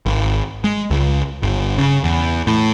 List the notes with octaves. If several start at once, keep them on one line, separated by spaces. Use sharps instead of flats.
G#1
G#3
C#2
G1
C#3
E2
A2